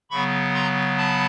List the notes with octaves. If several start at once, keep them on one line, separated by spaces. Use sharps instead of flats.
C#3 F#3 B3 B5 C#6
A#5 C6
A5 B5